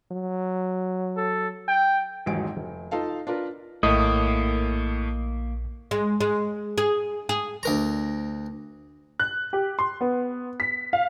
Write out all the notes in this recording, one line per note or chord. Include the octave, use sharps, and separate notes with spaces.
F#3
A4
G5
D#1 G#1 E2 G#2 F#3 D7
F1
D#4 F4 A4 F5 A5
D4 F4 A#4 B4
A#1 A2 A3 A#3 D#5 D#6
G#3
G#3
G#4
G#4
D2 A#4 A#5
F#6
G4
C6
B3
B6
F5